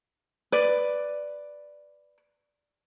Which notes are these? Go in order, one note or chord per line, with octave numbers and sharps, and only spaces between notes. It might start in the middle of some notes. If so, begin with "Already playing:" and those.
B4 D5